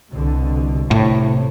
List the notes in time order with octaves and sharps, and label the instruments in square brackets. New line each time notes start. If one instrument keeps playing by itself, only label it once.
[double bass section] C2 B2 D3
[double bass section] A1 C3 [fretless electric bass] A2